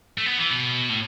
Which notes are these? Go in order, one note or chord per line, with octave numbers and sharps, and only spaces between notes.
A3
B3
E3
B2
A2